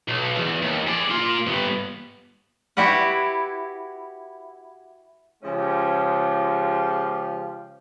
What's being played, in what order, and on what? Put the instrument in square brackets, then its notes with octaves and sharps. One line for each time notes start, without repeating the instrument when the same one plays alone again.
[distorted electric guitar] B1
E2
D#2
G#4 D5
A#3 F4
G2 B3
[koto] E4 F#4 G4 B4 F#5
[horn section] C#3 F3 G#3 C#4 F4 G4